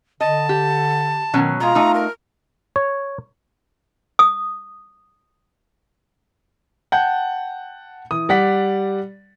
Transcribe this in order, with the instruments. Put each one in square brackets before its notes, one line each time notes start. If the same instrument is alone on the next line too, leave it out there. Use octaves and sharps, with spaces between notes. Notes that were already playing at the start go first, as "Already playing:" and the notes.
[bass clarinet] D3 [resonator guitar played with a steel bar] D#5 [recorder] A5
[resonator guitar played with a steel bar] G4
[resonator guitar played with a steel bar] B2 F#3 C#4 [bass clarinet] D#3
[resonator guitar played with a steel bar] B2 G#3 [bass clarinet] F4 [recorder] A#5
[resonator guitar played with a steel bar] A3 D#4
[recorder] A#4
[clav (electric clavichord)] C#5
[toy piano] D#6
[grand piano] F#5 G5 A5 G6
E3 D#6
G3 D5 F#5 B6